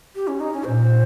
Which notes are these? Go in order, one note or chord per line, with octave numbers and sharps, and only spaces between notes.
G4
C#4
D#4
C#4
A#2 C5